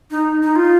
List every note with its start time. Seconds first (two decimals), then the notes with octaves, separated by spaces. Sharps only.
0.11 D#4
0.42 D#4
0.56 F4